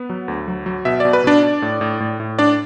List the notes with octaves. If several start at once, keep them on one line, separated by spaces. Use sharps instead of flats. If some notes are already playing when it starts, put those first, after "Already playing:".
Already playing: B3 B4
F#3
D2
F#3
F#3
B2 E5
B2 D5
B4
B2 D4 D5
D4
A2
A2
A2
A2
D4 D5